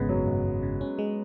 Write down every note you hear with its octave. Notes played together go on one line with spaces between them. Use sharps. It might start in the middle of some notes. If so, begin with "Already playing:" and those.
Already playing: G#1 C#3 G#3 B3
F#2 F#3
G#1
G#1
C#3
C#4
G#3